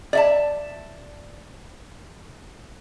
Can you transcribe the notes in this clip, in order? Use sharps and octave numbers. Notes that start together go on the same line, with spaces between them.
D5 E5 A5